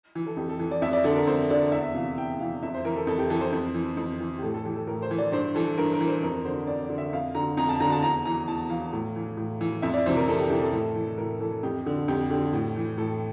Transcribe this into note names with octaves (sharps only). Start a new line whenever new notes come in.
E3
A4
F2 G4
A4
E3
D5
F2 E5
D5
D3 A4
A#4
F2 C5
D3 D5
E2 E5
C3 E3 F5
E2 G5
C3 E3 F5
F2 E5
C5
E3 A#4
A4
F2 A4
G4
E3 A4
C5
F2
E3
F2
E3
G4
A2 A4
A4
E3 G4
A4
A2 A#4
C5
E3
D5
G2 C5
E3 A4
G2 A#4
A#4
E3
C5
F2 A#4
D3 C5
F2 D5
D5
D3
E5
F2 F5
D3 A#5
F2 A#5
A5
D3 A#5
A5
E2 A#5
E3 A#5
E2 A5
E3 F5
A2
E3
A2
E3
F2 E5
D5
C3 E3 C5
A#4
F2 A4
G4
C3 E3 G4
A4
A2
E3
A2 A#4
E3 A4
F2 G4
D3
F2 G4
D3 G4
A2
E3
A2 A4